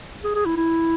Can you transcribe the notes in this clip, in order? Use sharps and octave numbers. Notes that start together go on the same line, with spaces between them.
G#4
G#4
E4
E4